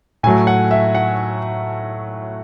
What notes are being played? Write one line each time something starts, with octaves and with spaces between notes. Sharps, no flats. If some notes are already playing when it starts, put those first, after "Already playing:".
A2 F#3 A3 G#5
F#5
E5
F#5